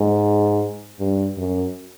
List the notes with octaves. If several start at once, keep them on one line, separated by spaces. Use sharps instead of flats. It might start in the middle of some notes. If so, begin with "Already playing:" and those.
Already playing: G#2
G2
F#2